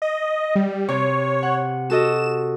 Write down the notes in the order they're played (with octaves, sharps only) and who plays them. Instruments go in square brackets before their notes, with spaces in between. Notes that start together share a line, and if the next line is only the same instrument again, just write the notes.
[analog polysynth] D#5
G3
[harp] C3 [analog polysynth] C#5
[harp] F#5
[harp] F#4 A4 D#5 [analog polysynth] E7